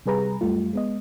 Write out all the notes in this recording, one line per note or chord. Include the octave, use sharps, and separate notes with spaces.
C3 G3 G#4 B4 A#5
F#2 G3 A3 F4
G#3 B3 D#5